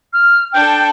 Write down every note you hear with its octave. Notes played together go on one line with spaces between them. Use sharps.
F6
D4 A4 G5